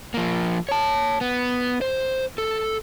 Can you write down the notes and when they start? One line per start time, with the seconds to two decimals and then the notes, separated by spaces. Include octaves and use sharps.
0.14 F3 A#3
0.69 C#5 A5
1.21 B3
1.81 C5
2.38 A4